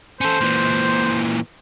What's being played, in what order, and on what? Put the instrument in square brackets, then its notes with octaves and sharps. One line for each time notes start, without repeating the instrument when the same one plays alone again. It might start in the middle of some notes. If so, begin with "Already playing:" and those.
[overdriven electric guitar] C#4 A4 [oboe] C5
[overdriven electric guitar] A#2 E3